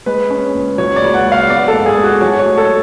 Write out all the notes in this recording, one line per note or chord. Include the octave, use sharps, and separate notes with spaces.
G#3 B4
C#4
C#2
F#3 C#5
D5
C#2
F#5
C#2
F5
B3 D5
A4
G#2
G#4
G#2
F#4
F#3 C#5
C#5
A3
A4